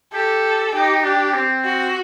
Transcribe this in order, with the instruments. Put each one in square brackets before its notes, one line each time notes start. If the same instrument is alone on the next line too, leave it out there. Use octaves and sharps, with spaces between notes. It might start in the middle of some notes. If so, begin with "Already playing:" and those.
[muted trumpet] G4 [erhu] A4
[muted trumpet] D#4 [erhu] G4
[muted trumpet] D4 [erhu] G4
[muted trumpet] C4
[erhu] F#4